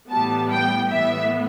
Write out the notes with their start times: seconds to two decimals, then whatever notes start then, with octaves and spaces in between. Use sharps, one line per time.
0.11 A2 E3 G3 B3 A5
0.51 G5
0.91 A2 E3 B3 E5